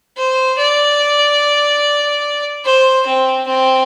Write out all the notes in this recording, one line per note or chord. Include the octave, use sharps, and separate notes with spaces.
C5
D5
C5
C4
C4